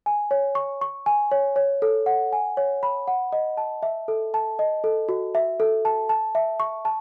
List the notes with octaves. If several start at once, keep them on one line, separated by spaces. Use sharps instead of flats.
G#5
C#5
C#6
C#6
G#5
C#5
C#5
A4
F#5
G#5
C#5
B5
F#5
D#5
A5
E5
A4
A5
D#5
A4
F#4
E5
A4
A5
A5
E5
C#6
A5